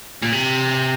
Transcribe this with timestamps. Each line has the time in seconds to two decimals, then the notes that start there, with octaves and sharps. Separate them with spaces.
0.22 A#2
0.33 C3